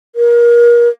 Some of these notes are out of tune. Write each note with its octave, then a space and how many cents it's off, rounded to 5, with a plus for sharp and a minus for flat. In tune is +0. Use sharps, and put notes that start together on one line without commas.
A#4 +30